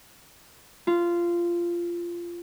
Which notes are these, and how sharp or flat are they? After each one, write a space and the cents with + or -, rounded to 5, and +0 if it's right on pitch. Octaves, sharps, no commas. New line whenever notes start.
F4 -15